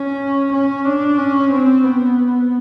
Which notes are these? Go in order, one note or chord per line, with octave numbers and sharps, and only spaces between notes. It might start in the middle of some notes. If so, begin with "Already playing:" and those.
Already playing: C#4
C#4
D4
C#4
C4
B3